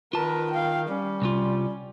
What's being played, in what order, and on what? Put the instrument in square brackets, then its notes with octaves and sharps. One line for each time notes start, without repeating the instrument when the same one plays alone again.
[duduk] D#3 [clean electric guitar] F4 A5 [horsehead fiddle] A#4 B4
[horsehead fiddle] F5 G5
[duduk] G3 [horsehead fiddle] C#4
[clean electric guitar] C2 F4